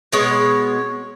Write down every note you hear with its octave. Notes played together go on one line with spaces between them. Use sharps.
B2 G#3 B3 C#5